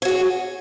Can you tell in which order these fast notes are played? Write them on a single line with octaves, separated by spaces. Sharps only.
C#5 F#4 G#4